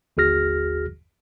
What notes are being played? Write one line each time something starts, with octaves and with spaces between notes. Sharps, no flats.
G1 D#2 F#4 G#4 F6 A#6